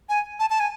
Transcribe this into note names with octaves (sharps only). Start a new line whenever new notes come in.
G#5
A5
A5
G#5